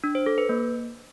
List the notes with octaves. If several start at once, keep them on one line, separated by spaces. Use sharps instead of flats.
D4
C5
A4
B4
A#3